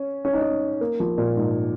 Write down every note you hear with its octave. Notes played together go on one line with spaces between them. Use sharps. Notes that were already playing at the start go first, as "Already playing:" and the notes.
Already playing: C#4
C#4
D#4
C#4
A#3
F3
A#2
G#2